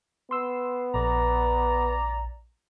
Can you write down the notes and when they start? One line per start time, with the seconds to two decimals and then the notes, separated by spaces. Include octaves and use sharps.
0.31 B3 C6 E6
0.94 A#1 D5 A#5